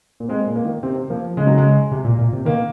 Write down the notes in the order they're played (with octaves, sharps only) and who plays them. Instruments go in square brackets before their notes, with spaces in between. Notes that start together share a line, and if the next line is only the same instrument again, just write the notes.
[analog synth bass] A#2
[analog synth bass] C3 [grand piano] G#3
[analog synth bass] A#2
[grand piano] A#3
[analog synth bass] D#3
[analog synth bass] C3 [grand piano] C4
[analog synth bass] F3 [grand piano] A#3
[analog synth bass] C#3 [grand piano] G#3
[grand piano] F#3
G#3
[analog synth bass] C3
A#2
A#2
C3
[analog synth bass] D#3 [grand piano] A#3